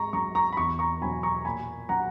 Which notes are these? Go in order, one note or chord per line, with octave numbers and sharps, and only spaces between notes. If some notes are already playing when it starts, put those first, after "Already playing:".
Already playing: G#2 A#5 C#6
F#3 A#5 C#6
A#5 C#6
B5
E2 A#5 C#6
A#5 C#6
B2 F#3 G#5 B5
A#5 C#6
A#2 G#5 B5
F#3 F#5 A#5